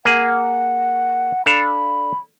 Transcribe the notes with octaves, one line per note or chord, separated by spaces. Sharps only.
A#3 G#4 F#5
D4 A4 F5 B5